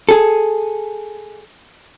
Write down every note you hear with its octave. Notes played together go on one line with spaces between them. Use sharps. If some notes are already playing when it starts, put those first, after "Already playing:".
G#4 A4